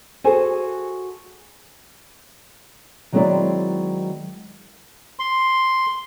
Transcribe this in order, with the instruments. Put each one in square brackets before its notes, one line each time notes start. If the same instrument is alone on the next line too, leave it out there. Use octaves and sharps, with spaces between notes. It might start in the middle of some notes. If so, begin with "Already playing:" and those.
[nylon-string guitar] F#4 G#4 A4 C5 G#5
D#3 F#3 G#3 C4 E4 D5
[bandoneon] C6